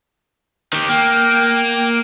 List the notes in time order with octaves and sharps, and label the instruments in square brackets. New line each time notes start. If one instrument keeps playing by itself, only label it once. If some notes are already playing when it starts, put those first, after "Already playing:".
[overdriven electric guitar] D#3 G4
[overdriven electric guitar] A#3 [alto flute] G5